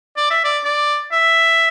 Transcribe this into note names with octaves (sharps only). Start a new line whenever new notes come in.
D5
E5
D5
D5
E5